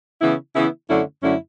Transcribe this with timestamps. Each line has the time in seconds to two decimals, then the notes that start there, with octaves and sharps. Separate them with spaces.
0.21 C#3 E3 B3 E4
0.55 C#3 E3 B3 E4
0.89 F#2 D3 A3 C#4 E4
1.23 F#2 D3 A3 C#4 E4